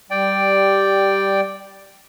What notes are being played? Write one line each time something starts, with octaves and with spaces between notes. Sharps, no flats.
G3 D5 G5